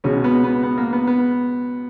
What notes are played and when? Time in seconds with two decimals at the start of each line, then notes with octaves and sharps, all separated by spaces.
0.04 C#2 B2 G#3 C#4
0.24 B3
0.44 B3
0.63 B3
0.78 A#3
0.93 B3
1.07 B3